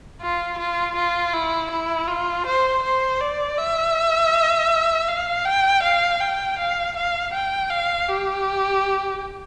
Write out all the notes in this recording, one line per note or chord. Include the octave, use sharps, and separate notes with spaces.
F4
F4
F4
E4
E4
F4
C5
C5
D5
E5
F5
G5
F5
G5
F5
F5
G5
F5
G4